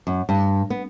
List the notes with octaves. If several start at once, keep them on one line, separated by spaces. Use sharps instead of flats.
F#2
G2
B3